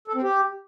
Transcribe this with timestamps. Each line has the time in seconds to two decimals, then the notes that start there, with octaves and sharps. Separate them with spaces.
0.08 A4
0.15 C4
0.22 G4